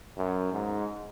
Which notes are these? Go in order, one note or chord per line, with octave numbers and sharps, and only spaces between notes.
F#2
G#2